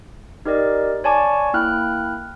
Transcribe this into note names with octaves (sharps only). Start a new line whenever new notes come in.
D#4 G4 A#4 D5 D#5
C#5 D5 G#5 A5 C#6 D6
A#3 E4 G5 F6 F#6